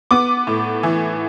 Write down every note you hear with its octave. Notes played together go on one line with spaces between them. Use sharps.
B3 D6
A2
E3